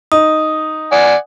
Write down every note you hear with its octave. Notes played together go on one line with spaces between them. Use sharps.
D#4 D#6
D5 F#5 G#5